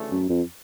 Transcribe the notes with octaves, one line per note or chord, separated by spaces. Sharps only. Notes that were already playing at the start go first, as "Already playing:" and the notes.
Already playing: D2 C#3 E3 A3
F#2
F2